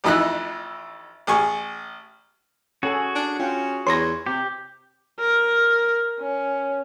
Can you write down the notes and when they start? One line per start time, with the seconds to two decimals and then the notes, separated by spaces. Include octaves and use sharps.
0.04 A1 F2 E3 D#4 E4 F#6
1.27 A1 G#4 C#6
2.83 C#4 F#4 G#4 A4 G#5
3.15 D4
3.40 C#4 F4 G5
3.87 E2 C#5 C6 C#6 A#6
4.26 C3 G4
5.19 A#4
6.20 C#4